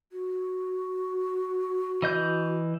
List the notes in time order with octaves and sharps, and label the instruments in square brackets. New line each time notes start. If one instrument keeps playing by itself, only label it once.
[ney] F#4
[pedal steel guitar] E3 D#5 G6